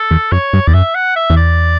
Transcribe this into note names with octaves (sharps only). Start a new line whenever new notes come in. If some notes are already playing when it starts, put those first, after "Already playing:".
Already playing: A4
E2
F#2 C#5
G2
E2 D5
F#2 E5
F#5
E5
E2
D5